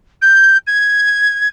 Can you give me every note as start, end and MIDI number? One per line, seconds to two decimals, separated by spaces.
0.22 0.58 91
0.67 1.49 92